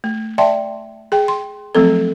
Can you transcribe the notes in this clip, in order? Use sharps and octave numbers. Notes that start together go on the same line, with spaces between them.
A3
D5 E5 G5 A5 C6
G#4 G5
C6
F3 F#3 A3 C4 A4